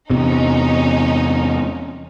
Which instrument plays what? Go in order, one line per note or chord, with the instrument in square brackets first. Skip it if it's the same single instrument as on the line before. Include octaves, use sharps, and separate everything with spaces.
[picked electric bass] E2 C3 [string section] C#4 D#4